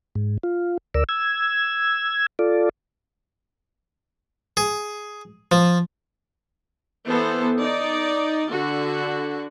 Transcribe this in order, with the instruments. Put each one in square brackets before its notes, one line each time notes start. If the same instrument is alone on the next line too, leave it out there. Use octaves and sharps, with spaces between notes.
[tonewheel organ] G#2
F4
D2 A#4 D5 E6
E6 G#6
F4 A4 D5
[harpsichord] G#4
F3
[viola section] E3 B3 A4 C5
D#4 D5
D3 F#4